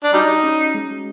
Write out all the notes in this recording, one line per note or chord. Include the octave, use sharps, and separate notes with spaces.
D4
G3 D#4 F#4
C#4
G#3